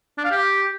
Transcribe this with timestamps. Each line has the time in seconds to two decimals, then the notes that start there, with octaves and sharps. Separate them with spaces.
0.18 D4
0.24 F5
0.31 G4